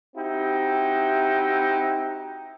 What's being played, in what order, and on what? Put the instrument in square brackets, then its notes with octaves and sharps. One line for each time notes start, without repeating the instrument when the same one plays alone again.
[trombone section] C4 D#4 E4 F#4 G4